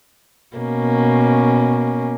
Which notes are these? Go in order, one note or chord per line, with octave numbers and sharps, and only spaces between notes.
B2 A#3 C#4